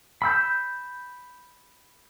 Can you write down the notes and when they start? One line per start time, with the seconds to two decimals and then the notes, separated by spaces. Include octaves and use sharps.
0.22 B5 E6 G6